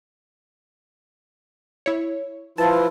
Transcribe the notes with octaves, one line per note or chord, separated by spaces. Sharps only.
E4 C#5
F3 E4 F4 B4 A5